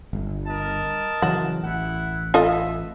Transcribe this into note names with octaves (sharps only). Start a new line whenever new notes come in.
G1
A#4 D#5 A5
C#3 E3 F#3 F#4
A1 E4 F#5
B3 E4 F4 A4 D#5 E5